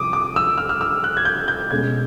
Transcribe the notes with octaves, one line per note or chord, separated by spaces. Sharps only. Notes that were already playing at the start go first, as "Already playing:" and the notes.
Already playing: C3 D6 D#6
D6
E6
F6
F6
E6
F#6
G#6
G6
G6
B2 G#3 C#4 G#6